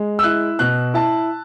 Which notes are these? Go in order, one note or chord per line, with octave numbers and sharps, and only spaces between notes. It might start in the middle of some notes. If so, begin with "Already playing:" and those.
Already playing: G#3
E6
E4 F#6
B2 F#6
E4 A5